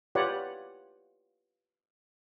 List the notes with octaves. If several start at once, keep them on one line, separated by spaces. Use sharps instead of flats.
F4 G4 B4 C#5 D5 F#5